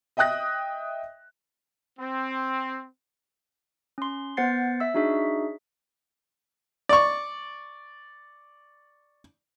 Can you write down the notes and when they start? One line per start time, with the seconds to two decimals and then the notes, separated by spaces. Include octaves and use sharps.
0.17 D#5 E5 G5 D#6 F#6 A#6
1.99 C4
3.98 C#4 C6
4.37 B3 C5 F#5 A6 C7
4.80 E5 E6
4.94 D4 D#4 F#4 G#4 E5
6.89 D5 C#6